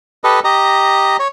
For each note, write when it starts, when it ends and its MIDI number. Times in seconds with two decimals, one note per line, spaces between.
0.24 0.40 67
0.24 0.40 69
0.24 0.40 71
0.24 0.40 75
0.44 1.17 67
0.44 1.17 75
0.44 1.17 82
1.19 1.28 73